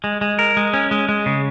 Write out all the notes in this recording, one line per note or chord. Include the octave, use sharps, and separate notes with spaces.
G#3
G#3
A#4
G#3
C#4
G#3
G#3
C#3